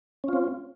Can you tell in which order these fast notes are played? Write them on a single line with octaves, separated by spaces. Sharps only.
C#4 F4 C4